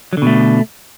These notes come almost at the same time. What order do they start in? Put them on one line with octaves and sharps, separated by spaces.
F#3 D3 B2 A3